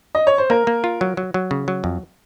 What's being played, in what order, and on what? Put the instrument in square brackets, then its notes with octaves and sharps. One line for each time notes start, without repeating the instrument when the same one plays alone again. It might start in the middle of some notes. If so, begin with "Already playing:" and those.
[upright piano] D#5
C#5
C5
[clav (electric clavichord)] A#3 [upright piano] A#4
[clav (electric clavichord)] A#3
F4
F#3
F#3
F#3
C#3
F#3
F2